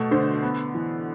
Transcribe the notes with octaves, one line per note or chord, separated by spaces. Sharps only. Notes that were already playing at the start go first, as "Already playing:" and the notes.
Already playing: B2 A3
D3 C5
B3
E3